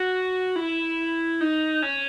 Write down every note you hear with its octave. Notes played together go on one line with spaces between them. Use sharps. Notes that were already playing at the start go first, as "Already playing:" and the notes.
Already playing: F#4
E4
D#4
C#4